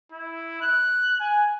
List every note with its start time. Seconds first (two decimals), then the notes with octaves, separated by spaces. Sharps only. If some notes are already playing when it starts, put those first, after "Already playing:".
0.12 E4
0.61 F#6
1.20 G#5